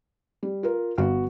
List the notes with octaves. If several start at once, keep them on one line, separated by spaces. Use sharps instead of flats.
G3
F4 A#4
G1 B3 F#4 F5